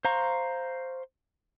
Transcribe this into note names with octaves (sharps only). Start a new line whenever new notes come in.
C5 F5 A#5 C6 C#6